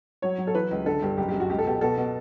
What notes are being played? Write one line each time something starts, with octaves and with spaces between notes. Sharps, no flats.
F#3 C#5
F#3
A4
E3 B4
C#2
D3 A4
G2 G4
F#1 G4
G4
F#2
F#4
C#2 G4
A4
B2 G4
B2 A4
B2